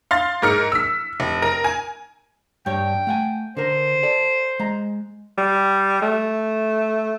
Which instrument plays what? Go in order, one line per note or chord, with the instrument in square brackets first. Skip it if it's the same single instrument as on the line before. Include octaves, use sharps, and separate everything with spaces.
[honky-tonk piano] F5 C6 A6
G#2 A#4 F6 C#7
E6 B6
F1
A#4
G#5
[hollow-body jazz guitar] G2 G3 C#5 [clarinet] G5
[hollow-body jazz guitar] A3 F#5 G#5
[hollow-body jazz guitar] D3 A#4 [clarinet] C5
[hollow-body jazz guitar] A4 D5
G#3 A#5
[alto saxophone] G3
A3